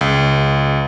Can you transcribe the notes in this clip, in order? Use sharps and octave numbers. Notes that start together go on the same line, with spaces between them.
C#2